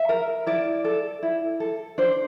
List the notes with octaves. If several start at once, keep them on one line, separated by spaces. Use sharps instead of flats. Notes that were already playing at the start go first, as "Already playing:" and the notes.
Already playing: E5
A#4
E4 D5
A4
E4
A4
D4 C5